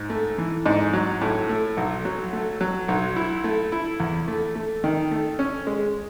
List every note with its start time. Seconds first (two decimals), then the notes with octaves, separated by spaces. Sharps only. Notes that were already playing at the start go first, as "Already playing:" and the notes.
Already playing: G#2
0.10 A3
0.38 E3
0.66 G#2
0.93 F#3
1.21 A2
1.49 A3
1.77 B1
2.05 F#3
2.33 A3
2.61 F#3
2.88 B1
3.16 E4
3.44 A3
3.72 E4
4.00 E2
4.28 A3
4.55 A3
4.84 D#3
5.11 A3
5.39 C#4
5.67 G#3